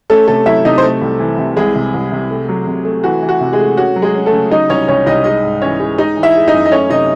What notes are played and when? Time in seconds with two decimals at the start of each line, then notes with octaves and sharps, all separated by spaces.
0.10 A3 C#4 A4
0.28 C3 A3 A4
0.46 F#3 E4 E5
0.65 C3 D#4 D#5
0.78 C5
0.83 A3 A4
1.01 C2
1.20 E3
1.38 C3
1.56 C2 G#3 G#4
1.76 C3
1.94 C2
2.12 C3
2.30 A3
2.49 F#3
2.67 C3
2.85 A3
3.03 E3 F#4
3.22 E3
3.29 F#4
3.41 C3
3.53 G#3 G#4
3.59 A3
3.77 C#4 F#4
3.96 F#3
4.02 G#3 G#4
4.15 C#4
4.26 A3 A4
4.32 C#3
4.51 F#3 D#4 D#5
4.69 C2 C#4 C#5
4.88 C2 C#4 C#5
5.06 C2 D#4 D#5
5.24 G#3 D#4 D#5
5.43 G#2
5.62 E3 C#4 C#5
5.80 G#3
5.98 G#3 D#4 D#5
6.17 E3
6.23 E4 E5
6.35 G#3
6.48 D#4 D#5
6.54 F#2
6.65 D#5
6.71 A3 C#4 C#5
6.90 C3 D#4 D#5